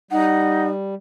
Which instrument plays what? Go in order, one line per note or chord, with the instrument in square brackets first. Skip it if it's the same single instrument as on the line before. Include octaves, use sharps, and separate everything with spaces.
[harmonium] G3 [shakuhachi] D#4 [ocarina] F#5